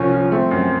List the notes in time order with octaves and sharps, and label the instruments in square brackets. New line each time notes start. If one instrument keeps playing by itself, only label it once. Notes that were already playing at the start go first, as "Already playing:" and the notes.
Already playing: [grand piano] C2 F3 [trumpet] C#4
[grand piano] F3
[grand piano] A3 [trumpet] C4
[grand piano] F#2